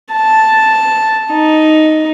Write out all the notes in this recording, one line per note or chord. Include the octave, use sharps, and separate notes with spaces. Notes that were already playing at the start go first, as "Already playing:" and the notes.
A5
D#4